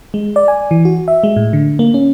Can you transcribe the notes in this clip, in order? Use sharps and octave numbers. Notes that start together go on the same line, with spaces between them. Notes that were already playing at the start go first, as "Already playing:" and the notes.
G#3
D5
G#5
E3
F#4
E5
G#3
A2
D3
A#3
C#4